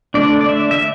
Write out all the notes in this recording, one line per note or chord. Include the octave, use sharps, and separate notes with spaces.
D3 A3 D4 D5
D5
E5
E5